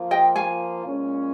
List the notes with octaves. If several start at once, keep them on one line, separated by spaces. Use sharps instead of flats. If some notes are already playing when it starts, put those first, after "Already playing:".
Already playing: F3 A#3 F4
D#5 G5
F5 G#5
A#2 G#3 C#4